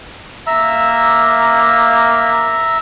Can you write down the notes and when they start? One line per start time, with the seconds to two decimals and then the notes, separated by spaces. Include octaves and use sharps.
0.47 A#3 E5 A#5 E6